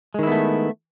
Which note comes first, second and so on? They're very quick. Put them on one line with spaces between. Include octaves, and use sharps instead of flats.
G#3 D#3 E4 B3 A3